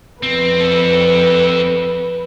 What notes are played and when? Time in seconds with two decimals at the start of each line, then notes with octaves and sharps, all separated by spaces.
0.23 F2 C4 B4
0.60 C4 A4